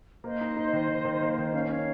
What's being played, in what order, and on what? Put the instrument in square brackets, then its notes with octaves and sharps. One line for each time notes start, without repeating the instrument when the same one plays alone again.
[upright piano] A#3 [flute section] C5 D#5
[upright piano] D#4
D#4
D#3
D#3
D#3
A#3
D#3
[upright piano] C#4 [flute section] F5
[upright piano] C#4 [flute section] C#5 F5